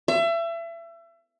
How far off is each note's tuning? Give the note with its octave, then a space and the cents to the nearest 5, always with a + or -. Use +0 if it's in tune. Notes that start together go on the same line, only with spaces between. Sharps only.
E5 +30